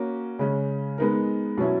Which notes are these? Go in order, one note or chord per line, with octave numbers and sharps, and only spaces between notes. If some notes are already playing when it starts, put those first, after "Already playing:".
Already playing: A#3 C#4 F#4
C#3 G#3 C#4
G#3 B3 D#4 A#4
B2 F#3 C#4 E4